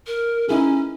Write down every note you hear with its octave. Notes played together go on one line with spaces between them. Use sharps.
A#4
C#4 D#4 E4 G#4